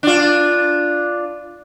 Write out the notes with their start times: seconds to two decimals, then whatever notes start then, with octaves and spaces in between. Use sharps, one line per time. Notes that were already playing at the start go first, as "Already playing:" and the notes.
0.03 D4 F4